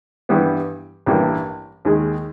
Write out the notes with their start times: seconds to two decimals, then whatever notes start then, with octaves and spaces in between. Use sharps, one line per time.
0.29 G2 E3 G3 B3
1.06 A1 G2 E3 G3 A#3
1.85 D#2 D#3 G#3